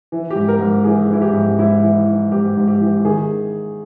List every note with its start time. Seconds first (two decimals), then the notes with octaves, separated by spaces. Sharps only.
0.12 E3
0.30 G#2 G4
0.48 A#4
0.60 G#2
0.84 E3 G#4
1.09 E3 E4
1.22 G4
1.33 G#2
1.58 G#2 E4
1.83 E3
2.07 E3
2.32 G#2 G4
2.57 G#2
2.68 G4
2.81 E3
3.05 D#3 G#4